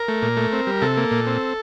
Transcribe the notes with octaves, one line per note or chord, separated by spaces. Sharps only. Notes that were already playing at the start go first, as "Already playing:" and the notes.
Already playing: A#4
A3
A#2
A3
C4
G3
C3 A4
A#3
A#2
C4